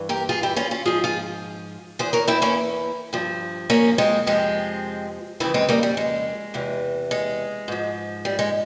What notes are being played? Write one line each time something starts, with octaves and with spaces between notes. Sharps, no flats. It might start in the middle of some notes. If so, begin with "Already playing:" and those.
Already playing: G2 E3
G4 A#4
F4 G#4
E4 G4
C#4 F4
C#4 F4
G#2 F3 F4 G#4
F4 G#4
E2 E3 G#4 C5
A#4 C#5
C4 E4
A#3 C#4
G2 F3
A#3 C#4
G#3 C4
F2 C3 F3 G#3 C4
F2 C#3 E3 C4 E4
G#3 C4
G3 A#3
G3
G#3
E2 C3 E3
G#3
G#2 F3
G3
G#3